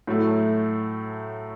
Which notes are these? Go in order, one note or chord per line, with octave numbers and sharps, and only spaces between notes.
A2 F#3 A3